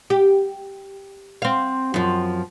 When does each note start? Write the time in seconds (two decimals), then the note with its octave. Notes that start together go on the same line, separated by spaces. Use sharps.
0.10 G4
1.42 C4 F5
1.94 F#2 F3